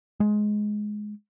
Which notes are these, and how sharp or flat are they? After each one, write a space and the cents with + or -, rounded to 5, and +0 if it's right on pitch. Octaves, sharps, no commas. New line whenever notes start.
G#3 +15